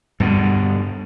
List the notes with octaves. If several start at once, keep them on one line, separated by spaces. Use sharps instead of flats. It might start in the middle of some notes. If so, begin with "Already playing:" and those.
G2 B2 D3